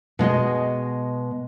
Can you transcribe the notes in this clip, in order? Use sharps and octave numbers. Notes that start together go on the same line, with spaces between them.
B2 G#3 G#4 D#5